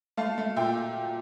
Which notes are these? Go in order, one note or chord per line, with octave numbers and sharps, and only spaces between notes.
A3 F5 A5
A3
A#2 E5 G5